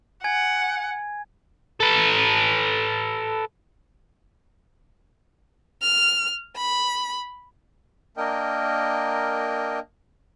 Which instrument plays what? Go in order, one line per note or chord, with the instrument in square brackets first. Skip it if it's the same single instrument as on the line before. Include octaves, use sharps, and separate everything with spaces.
[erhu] F#5 [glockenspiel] G#5 G#6
[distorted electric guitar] A4 B4
[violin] F6
B5
[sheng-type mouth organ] A#3 D4 A#4 D#5 G5